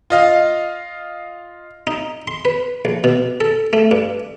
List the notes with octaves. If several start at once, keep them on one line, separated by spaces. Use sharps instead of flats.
F4 D#5 F5
D#4
C6
B4
A#1
B2
A4
A3
G2